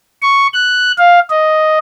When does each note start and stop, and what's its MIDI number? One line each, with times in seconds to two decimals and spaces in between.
0.22 0.47 85
0.53 0.92 90
0.98 1.19 77
1.30 1.79 75